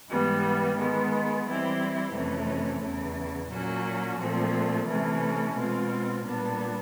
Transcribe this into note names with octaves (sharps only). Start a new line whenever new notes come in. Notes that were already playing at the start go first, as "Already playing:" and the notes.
G#2 E3 G3 B3
D#3 G#3 B3
E3 G3 C4 E4 G4
F2 C3 E3 A3 C#4
E2 C#3 E3
A#2 F#3 A#3 C#4 F#4
A#2 F3 A3 C4
C3 E3 A3 C#4
B2 G#3 C4 F4
A#2 G3 B3 D4